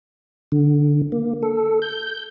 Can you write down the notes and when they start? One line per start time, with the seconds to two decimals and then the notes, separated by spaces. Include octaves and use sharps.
0.52 D3
1.12 A#3
1.43 A4
1.82 G6